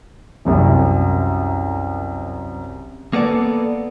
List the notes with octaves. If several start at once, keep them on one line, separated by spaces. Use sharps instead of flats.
C2 F#2 C3
A#3 B3 A4 D5